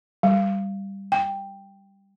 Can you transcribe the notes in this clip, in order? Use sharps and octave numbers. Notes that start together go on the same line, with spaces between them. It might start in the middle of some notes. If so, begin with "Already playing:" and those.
G3
G5